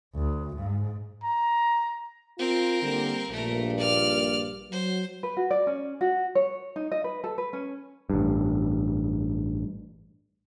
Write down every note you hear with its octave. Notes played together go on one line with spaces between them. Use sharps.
D2
G#2
A#5
C4 F4 A#4
D3 G3 A#3
A#1 G2 A#2 A3 A#4
D5 F6
F#3 C5
B4
F#4
D5
C#4
F#4
C#5
D#4
D#5
B4
A4
B4
C#4
A1 G2